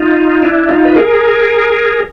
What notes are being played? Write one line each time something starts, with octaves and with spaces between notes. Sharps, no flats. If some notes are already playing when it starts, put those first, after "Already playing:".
Already playing: D#4 F4
D4 E4
D#4 F4
B4
G#4 A#4